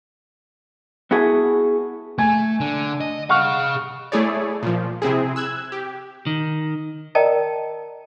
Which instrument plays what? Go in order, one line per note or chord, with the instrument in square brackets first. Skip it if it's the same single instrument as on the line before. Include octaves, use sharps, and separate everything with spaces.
[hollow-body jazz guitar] B3 E4 F#4 G#4 A4
[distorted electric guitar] A3 [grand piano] G#5 G#6
[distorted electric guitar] D3
D#5
[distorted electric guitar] G#4 F5 [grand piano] F#5 C#6 F6
[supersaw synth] A3 E4 G#4 C#5 D5
A#2 F3
C3 C4 E4 G#4
E6 F#6 G#6
G4
[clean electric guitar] D#3
[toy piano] A#4 D5 D#5 G5 A5 A#5